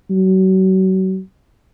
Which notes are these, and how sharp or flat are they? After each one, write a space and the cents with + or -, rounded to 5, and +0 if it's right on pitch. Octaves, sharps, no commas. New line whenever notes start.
F#3 +35